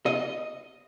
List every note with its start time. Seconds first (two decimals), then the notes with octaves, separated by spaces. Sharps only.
0.06 D#5